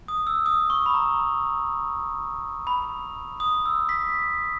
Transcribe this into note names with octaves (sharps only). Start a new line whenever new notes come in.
D#6
E6
D#6
C#6
B5
A#5
B5
D#6
E6
B6